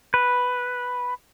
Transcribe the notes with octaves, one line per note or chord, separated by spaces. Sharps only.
B4